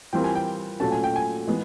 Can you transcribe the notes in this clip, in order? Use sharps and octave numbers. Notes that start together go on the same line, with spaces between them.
E3 G3 C4 F4 A#4 G5
G#5
G5
A#2 F#3 A3 C#4 F#4 A5
G#5
G5
G#5
E3 G#3 B3